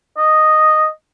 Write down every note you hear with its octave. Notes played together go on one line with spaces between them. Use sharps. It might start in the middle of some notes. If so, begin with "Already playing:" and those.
D#5